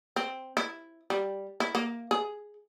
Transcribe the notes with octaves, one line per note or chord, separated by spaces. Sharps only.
C4
E4
G3
E4
A#3
G#4